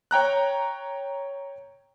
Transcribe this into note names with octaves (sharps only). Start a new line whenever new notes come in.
C#5 G5 A#5 F#6